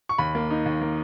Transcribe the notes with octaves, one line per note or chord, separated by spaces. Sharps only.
C#6
D#2 B5
A#3
D#4
D#2
A#3